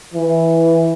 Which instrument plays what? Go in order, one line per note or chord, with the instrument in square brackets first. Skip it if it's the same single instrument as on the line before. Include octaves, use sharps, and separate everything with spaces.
[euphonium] E3